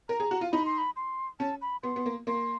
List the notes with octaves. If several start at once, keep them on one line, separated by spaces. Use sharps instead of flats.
A#4 A#5
G#4
F#4
F4
D#4 B5
C6
B5
C6
C#4 A5
B5
B3 C6
B3
A#3
A#3 C6